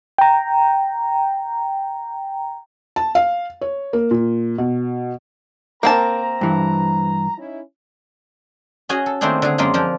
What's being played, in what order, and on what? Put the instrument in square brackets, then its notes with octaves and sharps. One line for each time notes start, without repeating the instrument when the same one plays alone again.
[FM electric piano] G5 A#5
[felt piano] A5
F5
C#5
A#3
A#2
B2
[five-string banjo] A#3 C4 A5 [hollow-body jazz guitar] A#4 [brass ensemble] A#5
[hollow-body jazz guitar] G2 E3
[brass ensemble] C#4 D#4 E4
[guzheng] C#4 F#4 G#4 D#5 G#5
A4
D#3 A3 A#3 C4 D4 G#4
D3 G#4
F#2 G#3 A#3 F4 G#4
D3 F3 A#3